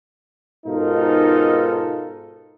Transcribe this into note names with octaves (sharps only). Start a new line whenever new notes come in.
G#2 B2 D#4 F4 A4 A#4